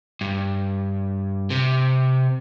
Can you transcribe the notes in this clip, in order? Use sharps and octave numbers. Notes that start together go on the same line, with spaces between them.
G2
C3